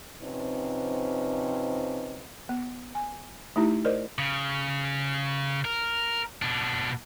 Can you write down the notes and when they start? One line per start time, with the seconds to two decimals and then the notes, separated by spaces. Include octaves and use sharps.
0.22 C3 F3 C4 C#4 D#4 B4
2.49 B3
2.95 G#5
3.56 A3 D#4 E4 G4
3.85 A#4 C5 D5 D#5
4.18 C#3
5.65 A#4
6.42 B2 D4